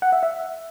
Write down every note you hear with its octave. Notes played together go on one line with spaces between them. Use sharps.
F#5
E5
E5